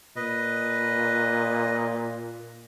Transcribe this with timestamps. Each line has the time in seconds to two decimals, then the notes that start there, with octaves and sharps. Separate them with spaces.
0.16 A#2 B4 D#5